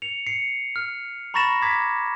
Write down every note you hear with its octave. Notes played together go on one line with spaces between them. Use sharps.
C#7 F7
C7 C#7
F6
A#5 B5 C#6 A6 A#6 E7
A#5 D6 G#6 B6